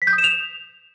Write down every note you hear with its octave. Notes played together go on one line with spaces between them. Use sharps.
B6
G6
D#6
E7
F7